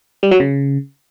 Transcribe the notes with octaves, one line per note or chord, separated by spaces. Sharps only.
G3
F#3
C#3